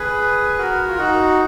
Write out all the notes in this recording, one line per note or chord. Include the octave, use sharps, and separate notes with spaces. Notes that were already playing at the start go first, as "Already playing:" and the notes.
Already playing: G#4 B4
F#4 A#4
F4
D#4 F#4